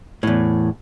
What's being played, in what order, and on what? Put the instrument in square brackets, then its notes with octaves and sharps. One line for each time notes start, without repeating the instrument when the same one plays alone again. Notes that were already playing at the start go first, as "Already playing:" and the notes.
[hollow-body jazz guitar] E2 A2